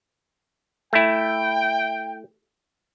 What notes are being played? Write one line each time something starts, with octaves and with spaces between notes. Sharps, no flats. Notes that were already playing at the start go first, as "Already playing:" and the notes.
A3 E4 G5